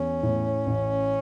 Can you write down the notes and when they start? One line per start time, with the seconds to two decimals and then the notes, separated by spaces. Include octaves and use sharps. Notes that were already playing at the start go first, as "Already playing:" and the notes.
Already playing: E2 C#4
0.23 A2
0.67 A1